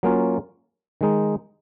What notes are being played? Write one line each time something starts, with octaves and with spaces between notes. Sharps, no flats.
F#3 A#3 C#4 F4
D#3 G#3 D#4